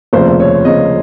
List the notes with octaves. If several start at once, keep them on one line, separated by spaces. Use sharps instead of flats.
F1 D#2 C#3 F3 C5
C#5
F1 D#2 C#3 F3 D#5